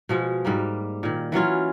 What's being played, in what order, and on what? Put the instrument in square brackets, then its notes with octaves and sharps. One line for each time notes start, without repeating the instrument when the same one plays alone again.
[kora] B2 F3 G#3
G#2 G3 A#3
A#2 D#3
E3 F#3 C#4 F4